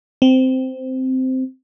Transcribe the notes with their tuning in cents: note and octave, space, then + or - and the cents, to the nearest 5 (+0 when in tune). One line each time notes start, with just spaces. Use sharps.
C4 -10